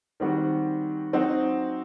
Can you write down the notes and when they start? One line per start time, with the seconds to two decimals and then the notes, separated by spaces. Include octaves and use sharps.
0.20 D#3 G3 C4 F#4
1.13 F#3 C4 D#4 F#4